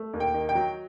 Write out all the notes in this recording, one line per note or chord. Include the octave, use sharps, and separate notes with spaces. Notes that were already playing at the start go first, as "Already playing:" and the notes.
Already playing: A3
D#2
G5
D#3
G5
F#3